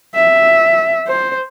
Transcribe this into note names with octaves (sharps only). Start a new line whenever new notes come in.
E5
C5